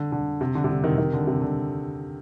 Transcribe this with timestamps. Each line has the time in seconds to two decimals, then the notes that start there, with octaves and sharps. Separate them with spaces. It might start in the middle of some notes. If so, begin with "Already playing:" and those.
Already playing: D3
0.12 D3
0.41 C3
0.55 D3
0.64 C3
0.70 D3
0.84 C3 D#3
0.98 C3 D#3
1.13 D3
1.27 C3
1.41 D3